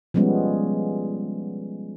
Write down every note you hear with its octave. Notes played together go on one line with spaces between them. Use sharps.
F3 G3 G#3 B3 C#4